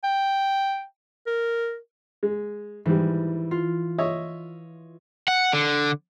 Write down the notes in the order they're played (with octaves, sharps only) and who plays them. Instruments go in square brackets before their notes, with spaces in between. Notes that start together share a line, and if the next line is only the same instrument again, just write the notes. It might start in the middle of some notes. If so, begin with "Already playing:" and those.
[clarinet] G5
A#4
[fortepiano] G#3
[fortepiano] G#2 G3 [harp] E3
[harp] F4
[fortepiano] C#5 D#5 E5
[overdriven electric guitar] F#5
D3